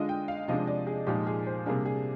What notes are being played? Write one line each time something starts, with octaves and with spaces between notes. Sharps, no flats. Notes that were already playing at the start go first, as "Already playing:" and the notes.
Already playing: D3 G#3 D4 F4 D#5
G5
F5
C3 F3 G#3 D4 D#5
D5
G#4
A#2 F3 G#3 D#4 G4
G#4
C5
C3 G3 A#3 D4 G#4
G#4